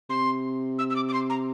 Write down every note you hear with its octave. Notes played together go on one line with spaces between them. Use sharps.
C3 C6
E6
E6
D6
D6
C6
A#5